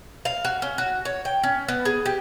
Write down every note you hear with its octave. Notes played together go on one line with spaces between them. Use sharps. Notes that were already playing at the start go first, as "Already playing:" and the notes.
F5
F#4
C#4
F#4
C#5
G5
C#4
B3
G#4
G4